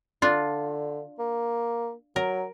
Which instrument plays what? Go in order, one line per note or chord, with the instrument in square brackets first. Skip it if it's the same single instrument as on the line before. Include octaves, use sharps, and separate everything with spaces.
[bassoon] D3 [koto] D4 F4
[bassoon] A#3
[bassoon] F#3 [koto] A#4